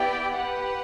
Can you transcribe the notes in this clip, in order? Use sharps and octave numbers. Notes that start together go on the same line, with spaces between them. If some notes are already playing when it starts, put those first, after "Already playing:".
Already playing: B3 E4 G4 D5 G5
G4 B4 F#5